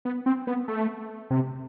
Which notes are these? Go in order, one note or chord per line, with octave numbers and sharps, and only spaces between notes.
B3
C4
B3
A3
C3